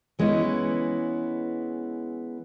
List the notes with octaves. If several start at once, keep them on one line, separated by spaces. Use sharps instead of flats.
E3 G#3 B3 C#4 E4